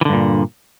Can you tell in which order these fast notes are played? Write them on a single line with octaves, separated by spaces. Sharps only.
E3 D3 G2 A#2